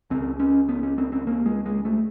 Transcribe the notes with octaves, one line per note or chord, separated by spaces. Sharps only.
C#2 C#3 C4
C#4
B3
C#4
C4
C4
A#3
G#3
G#3
A3